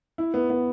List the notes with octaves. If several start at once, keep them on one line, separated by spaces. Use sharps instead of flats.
E4
B3
B3